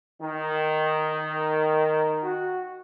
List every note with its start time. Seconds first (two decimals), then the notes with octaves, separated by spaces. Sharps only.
0.21 D#3
2.23 F#4